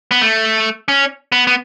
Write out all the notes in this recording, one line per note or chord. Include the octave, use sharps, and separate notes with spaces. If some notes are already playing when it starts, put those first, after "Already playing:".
B3
A3
C#4
B3
B3